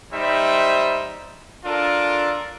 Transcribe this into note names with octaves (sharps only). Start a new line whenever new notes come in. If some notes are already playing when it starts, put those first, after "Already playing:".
G3 D#4 C5 E5
D4 F4 A4 A#4